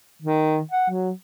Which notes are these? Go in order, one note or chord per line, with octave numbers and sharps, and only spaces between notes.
D#3
F#5
F#3